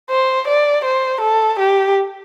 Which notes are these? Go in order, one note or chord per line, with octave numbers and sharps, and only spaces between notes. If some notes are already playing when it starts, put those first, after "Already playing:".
C5
D5
C5
A4
G4